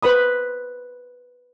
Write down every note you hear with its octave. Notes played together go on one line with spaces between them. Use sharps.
B4 C5 B5 D#6